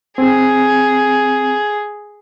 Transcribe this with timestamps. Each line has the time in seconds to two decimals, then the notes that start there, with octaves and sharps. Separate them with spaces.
0.18 C4 G#4